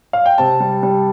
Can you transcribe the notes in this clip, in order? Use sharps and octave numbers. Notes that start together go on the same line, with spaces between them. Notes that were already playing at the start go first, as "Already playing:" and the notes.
F5
G5
C3 A5
G3
G3